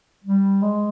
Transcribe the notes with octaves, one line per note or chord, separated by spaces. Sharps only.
G3
G#3